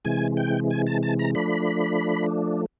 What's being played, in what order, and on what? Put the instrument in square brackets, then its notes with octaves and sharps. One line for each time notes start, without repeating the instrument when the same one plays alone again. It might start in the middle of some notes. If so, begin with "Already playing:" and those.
[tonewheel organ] C3 E3 G#3 G#5
G5
G#5
A5
A5
A#5
F3 A3 D4 B5